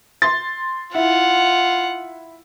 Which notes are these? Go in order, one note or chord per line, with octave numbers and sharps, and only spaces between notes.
C6 A6
E4 F4 F#5